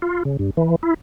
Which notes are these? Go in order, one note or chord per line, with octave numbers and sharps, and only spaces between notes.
F4
C#3
G2
E3
E4